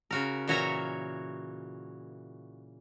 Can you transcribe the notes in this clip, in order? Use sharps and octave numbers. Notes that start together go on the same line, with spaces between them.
C#3 F#4 A#4
A#2 E3 F#4 C#5 E5 A#5